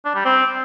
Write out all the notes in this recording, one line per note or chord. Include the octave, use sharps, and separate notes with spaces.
D4
G3
C4